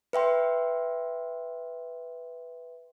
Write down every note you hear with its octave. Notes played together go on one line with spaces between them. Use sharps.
B4 E5 G5 C6